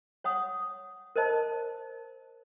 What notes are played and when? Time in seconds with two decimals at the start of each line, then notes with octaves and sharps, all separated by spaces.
0.24 C#5 F#5 D#6
1.16 A#4 C5 D#5 A5